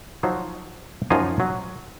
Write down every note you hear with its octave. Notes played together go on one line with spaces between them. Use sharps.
F3 F#3 D#4 C5 C#5
F#2 F3 F#3 D#4 F5 G#5
F#3